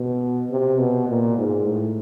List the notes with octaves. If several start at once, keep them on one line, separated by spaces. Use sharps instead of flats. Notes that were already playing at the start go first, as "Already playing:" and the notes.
Already playing: B2
C3
B2
A#2
G#2
A2